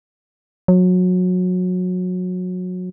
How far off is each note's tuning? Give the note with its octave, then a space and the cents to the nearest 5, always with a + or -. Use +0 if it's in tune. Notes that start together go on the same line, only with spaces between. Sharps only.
F#3 -25